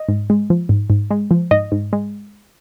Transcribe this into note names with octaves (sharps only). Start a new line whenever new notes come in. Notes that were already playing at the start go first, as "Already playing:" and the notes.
Already playing: D#5
G#2
G#3
F3
G#2
G#2
G#3
F3
G#2 D#5
G#2
G#3